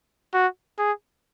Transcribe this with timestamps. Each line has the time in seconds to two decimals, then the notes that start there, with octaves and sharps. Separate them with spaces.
0.34 F#4
0.79 G#4